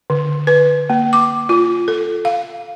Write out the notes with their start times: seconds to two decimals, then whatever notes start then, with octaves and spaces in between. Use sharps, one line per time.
0.10 D3
0.47 B4
0.90 A#3
1.13 D6
1.49 F4
1.88 A4
2.25 F5